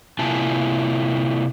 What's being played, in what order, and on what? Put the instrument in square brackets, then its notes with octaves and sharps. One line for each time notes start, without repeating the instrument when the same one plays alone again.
[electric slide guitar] C3 A#3 E4 F4 G#5 A5